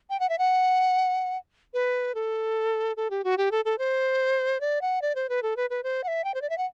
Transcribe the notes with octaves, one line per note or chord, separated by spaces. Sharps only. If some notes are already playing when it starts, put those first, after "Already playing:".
G5
F#5
E5
F#5
B4
A4
A4
G4
F#4
G4
A4
A4
C5
D5
F#5
D5
C5
B4
A4
B4
B4
C5
F#5
E5
G5
C5
D5
E5
F#5